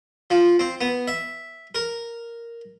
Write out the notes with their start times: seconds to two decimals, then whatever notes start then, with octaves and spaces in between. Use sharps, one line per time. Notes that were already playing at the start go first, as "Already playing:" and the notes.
0.30 F3
0.59 C4
0.81 B3
1.08 E5
1.75 A#4